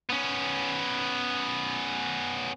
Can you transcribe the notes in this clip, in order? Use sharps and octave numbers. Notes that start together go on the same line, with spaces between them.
B3 C#4